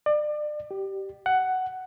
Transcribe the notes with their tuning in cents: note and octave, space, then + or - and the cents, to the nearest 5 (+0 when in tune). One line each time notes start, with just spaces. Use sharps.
D5 +35
G4 -15
F#5 +10